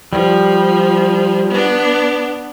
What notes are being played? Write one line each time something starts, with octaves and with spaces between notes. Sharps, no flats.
F3 G3
B3 D4